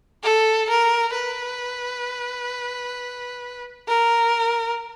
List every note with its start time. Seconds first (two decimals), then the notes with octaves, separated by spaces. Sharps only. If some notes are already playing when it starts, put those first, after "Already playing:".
0.23 A4
0.69 A#4
1.14 B4
3.88 A#4